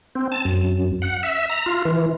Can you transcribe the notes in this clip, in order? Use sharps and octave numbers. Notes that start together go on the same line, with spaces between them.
C4
A5
F#2
F#5
E5
A#5
F4
E3